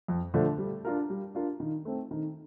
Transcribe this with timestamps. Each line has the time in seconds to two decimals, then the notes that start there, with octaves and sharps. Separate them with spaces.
0.08 F2
0.34 D3 F3 A3 D4
0.58 G3
0.85 D4 F4 A#4
1.10 G3
1.34 D4 F4 A#4
1.60 D#3
1.85 A3 C4
2.11 D#3